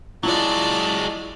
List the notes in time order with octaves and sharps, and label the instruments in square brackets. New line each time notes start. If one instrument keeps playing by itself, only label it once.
[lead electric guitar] F#3 G#3 [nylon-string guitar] E4 F4 [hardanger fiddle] D5 A5